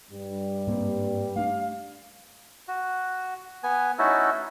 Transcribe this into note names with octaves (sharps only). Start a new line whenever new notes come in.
G2 G3
G#2 A#3 C4
A3 B3 D4 F5
F#4
B3 G#5
A3 C#4 D#4 E4 F#4 A4